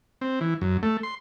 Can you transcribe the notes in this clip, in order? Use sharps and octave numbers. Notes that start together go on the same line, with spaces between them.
C4
E3
F#2
A3
C6